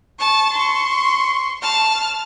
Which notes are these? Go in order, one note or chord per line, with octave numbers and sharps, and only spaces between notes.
A5 C#6
C6 C#6
A5 F6